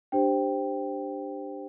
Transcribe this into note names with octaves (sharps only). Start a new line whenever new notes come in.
D4 G4 C5 G5